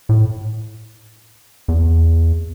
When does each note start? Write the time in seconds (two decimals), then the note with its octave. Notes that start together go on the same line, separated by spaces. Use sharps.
0.09 A2
1.68 E2